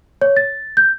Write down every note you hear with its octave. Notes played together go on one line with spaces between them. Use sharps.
C#5
A6
G6